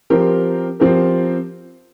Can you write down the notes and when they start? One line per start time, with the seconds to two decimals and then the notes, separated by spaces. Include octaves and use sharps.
0.10 F3 C4 G4 A#4
0.80 F3 C4 G4 A#4